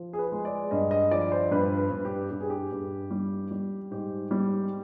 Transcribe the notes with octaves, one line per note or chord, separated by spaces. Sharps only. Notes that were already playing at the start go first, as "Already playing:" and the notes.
Already playing: F3
G#4
B4
G#3
D5
G2 D#5
D#5
F3 D5
C5
G2 B4
B4
G2
G4
G2 G4
G#4
G4
G2
G3
G3
G#2 G4
G3